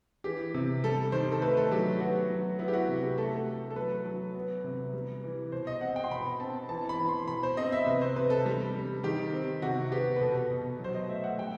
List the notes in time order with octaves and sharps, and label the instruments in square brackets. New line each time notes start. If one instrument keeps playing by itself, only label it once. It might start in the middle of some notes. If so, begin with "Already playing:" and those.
[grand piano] E3 G4
C3
G3 A4
D#3 C5
A4
A3 B4
A4
F#3 G4
B3 F#4
F#3
B3 E4
G4
F#4
C3
G4
A3 A4
A3
A4
F#3 B4
F#3
B3
C3
G3
E3
B2 C5
D#5
C4 F#5
G5
C6
B2 B5
C4 A5
E3 A5
B5
E3
C6
B2 B5
C5
C4 D#5
E5
C3 B4
C5
C3 B4
A4
G3
G3
D#3 G4
C4
C3 F#4
B3 G4
B4
B2 A4
B2
F#3 C5
D#5
A3 E5
F#5
G3 G5